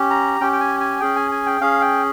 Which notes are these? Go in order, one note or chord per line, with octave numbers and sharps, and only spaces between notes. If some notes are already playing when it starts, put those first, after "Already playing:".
Already playing: C#4 G4
A#5
C#4 G4 G5
G5
G#5
G#5
C#4 G#4 G5
G#5
G#5
G5
C#4 G#4 F5
G5